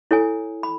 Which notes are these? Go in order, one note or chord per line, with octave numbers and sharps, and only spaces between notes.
E4 A4 C#5 G#5
B5